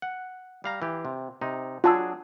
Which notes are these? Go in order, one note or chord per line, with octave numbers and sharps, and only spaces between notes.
F#5
G3 F5 A#5
E3 G4
C3
C3 D#4
F#3 D4 F4 G#4 A5 E6